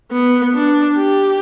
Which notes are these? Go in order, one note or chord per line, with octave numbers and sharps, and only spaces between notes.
B3
D4
G4